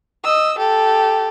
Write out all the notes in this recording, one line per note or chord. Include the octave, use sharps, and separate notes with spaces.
D#5 E6
G4 A4